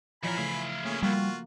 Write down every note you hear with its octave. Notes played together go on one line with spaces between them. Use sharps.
A#2 E3 F3 A#4 C#5 G#5 B5
C#3 A3 E4 F5
A3 A#3 C#4 G#4
F3 G3 A#3 F4 F#4